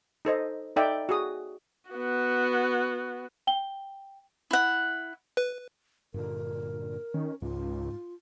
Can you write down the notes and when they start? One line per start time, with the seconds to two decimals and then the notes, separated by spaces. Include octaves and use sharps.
0.25 D#4 A4 C5 D#5
0.76 D#4 A4 D5 E5 G5
1.09 F#4 G#4 D#6
1.90 B3 F#4
3.47 G5 G7
4.51 E4 F#5
5.37 B4
6.14 G2 A#2 D3 A#4
7.14 D#3 C#4
7.42 C#2 G#2 F4